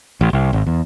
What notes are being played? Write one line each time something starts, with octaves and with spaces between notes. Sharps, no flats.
A1
C2
G#1
E2